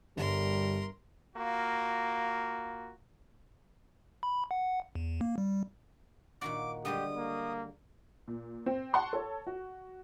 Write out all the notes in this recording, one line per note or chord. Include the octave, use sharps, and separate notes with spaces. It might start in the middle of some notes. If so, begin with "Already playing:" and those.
G1 G3 A#4 C6
A#3 F4 F#4
B5
F#5
E2
A#3
G3
A#2 D#3 F#4 D6
D3 G3 G#3 G4 D#6
A#3
A#2
C4
F#5 A5 C6 C#6
A4 C#5
F#4